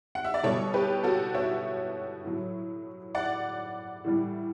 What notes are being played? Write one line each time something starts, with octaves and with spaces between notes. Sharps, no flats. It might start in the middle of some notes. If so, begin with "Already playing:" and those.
F#5
E5
D5
B2 G3 A4 C#5
G4 B4
F#4 A4
C#5 E5
A2 F#3
D5 F#5
A2 E3 G3